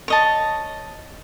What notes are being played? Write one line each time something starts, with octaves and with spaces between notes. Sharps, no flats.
C#5 D#5 A5